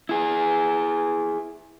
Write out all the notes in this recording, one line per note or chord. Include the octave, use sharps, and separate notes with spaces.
E4 G#4